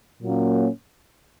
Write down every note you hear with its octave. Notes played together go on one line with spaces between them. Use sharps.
A#2 F#3 A#3 C#4